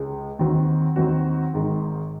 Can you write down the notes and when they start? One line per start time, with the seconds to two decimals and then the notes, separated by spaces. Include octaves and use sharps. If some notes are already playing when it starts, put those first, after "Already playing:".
Already playing: C#2 C#3 G#3
0.39 D#2 D#3 F#3 C4 F#4
0.96 D#2 D#3 F#3 C4 F#4
1.53 G#1 G#2 D#3